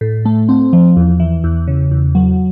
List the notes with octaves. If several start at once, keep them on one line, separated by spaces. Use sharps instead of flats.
A2
A3
C4
F3
E2
E3
E2
C#3
E2
F#3